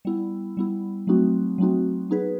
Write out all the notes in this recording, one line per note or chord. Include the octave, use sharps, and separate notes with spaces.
G3 B3 E4
G3 B3 E4
F#3 A3 C4 D#4 F#4
F#3 A3 C4 D#4 F#4
F#3 B3 D#4 G#4 B4